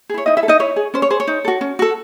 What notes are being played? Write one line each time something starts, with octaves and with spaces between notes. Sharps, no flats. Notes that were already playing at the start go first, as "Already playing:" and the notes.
E4 G#4
C#5
D#4 E4 D#5
E4 E5
A4
D#4 D#5
E4 C#5
G#4
C#4 C5
C#5
G#4 C5
C#5
D#4
F#4 A4
C#4
F#4 A4